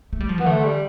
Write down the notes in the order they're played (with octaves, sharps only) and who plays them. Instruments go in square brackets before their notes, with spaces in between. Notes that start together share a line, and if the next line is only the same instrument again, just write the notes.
[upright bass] A3
G3
F3
[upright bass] E3 [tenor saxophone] B3
[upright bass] D3 [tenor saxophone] A3
[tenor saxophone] G3